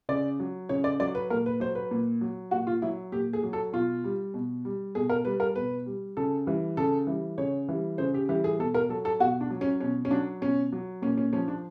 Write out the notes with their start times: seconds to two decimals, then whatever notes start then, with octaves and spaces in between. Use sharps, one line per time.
0.09 C#3 D5
0.40 F#3
0.69 C#3 C#5
0.84 D5
1.00 F#3 D5
1.15 B4
1.30 A#2 A#4
1.46 B4
1.60 F#3 C5
1.75 B4
1.91 A#2
2.21 F#3
2.51 A#2 F#4
2.67 F4
2.82 F#3 E4
3.12 A#2 G4
3.33 G#4
3.43 F#3
3.53 A4
3.73 B2 F4
4.04 G3
4.34 B2
4.65 G3
4.95 B2 G#4
5.10 A#4
5.25 G3 B4
5.40 A#4
5.56 B2 B4
5.86 G3
6.17 C#3 A4
6.46 E3 G3
6.77 C#3 A4
7.07 E3 G3
7.38 C#3 C#5
7.69 E3 G3
7.98 C#3 C5
8.14 G4
8.29 E3 G4
8.34 G3
8.44 G#4
8.59 B2 A4
8.75 A#4
8.89 F#3 A4
9.05 A4
9.20 B2 F#4
9.41 D4
9.50 F#3
9.61 C#4
9.80 B2 C#4
10.05 C#4
10.11 F#3 D4
10.42 B2 C#4
10.73 F#3
11.02 A#2 C#4
11.17 C#4
11.33 F3 C#4
11.48 D4